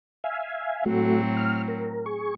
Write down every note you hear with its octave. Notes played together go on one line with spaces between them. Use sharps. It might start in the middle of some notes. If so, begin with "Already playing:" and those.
E5 F5 G#5
A2 F#3 A3 C4 F#4
F6
A#4
G#4 C#6